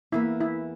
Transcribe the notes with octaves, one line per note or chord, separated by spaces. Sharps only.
E2 E3 A#3 E4
E4